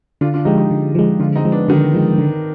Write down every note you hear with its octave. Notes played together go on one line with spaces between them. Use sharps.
D3 D4 F4
D4 F4
F3 G#3 D#4 G4
D#4 G4
D3
F3 G#3
D3 D4 F4
C4 D#4
F3 G#3
B3 D4
D3 D#3
F3 G#3
D3